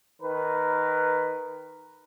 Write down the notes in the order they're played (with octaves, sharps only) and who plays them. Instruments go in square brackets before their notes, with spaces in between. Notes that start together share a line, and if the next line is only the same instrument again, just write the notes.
[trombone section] D#3 A#4 B4